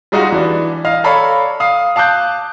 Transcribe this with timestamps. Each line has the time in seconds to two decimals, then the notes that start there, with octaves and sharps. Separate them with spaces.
0.12 G3 G#3 D#4 F4 F#4
0.32 E3 D4
0.85 D#5 F5 F6
1.04 A4 C#5 D5 F5 A#5 B5
1.60 F5 D#6
1.96 F5 A5 D6 F#6 G6